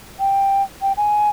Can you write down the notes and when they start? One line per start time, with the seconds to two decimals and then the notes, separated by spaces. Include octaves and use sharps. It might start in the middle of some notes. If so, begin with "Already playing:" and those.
0.19 G5
0.82 G5
0.97 G#5